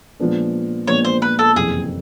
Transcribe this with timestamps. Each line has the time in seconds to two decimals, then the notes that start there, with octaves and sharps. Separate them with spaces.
0.20 A#2 F3 G#3 B3 D4
0.87 A#2 F3 G#3 B3 D4 C#5
1.05 C5
1.22 B4
1.39 A4
1.56 F#1 F2 C3 E3 G#4